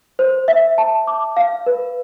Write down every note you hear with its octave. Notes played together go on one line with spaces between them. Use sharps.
C5
E5
A5
D6
F5
B4